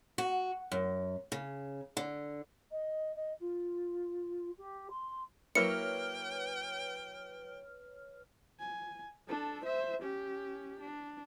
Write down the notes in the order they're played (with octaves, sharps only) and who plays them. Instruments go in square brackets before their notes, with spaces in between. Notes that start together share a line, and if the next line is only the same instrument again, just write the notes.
[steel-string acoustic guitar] F#4
F#2
C#3
D3
[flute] D#5
D#5
F4
G4
C6
[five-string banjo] F#3 A#3 E4 [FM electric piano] B4 C#5 F6 [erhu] G5 [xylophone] C#7
[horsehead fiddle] G#5
D4 A4
C5 E5
C#4 G4
D4